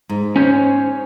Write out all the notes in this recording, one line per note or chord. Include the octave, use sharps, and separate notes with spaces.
G#2
C#4 C5 C#5